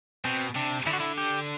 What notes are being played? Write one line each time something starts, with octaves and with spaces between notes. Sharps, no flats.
B2 C4
C3 D4
D3 E4
F#4
E4
G4